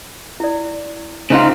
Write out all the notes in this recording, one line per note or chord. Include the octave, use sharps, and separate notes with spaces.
E4 D5
C#3 C#4 D#4 F4 C5